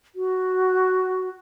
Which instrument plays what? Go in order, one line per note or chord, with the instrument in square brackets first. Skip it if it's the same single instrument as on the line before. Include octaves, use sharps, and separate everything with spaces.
[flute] F#4